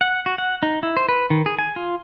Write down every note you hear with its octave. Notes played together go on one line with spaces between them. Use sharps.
F#5
F#4
F#5
D#4
E4
C5
B4
D#3
G#4
G#5
F4